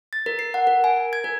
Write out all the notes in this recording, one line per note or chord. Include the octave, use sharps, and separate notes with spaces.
A6
A#4
C7
F#5
A#4
G#5
G#6
A#4